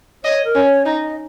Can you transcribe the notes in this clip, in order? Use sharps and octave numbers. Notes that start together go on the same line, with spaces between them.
C#5 D#5
A#4
C#4
C#5
D#4 D#5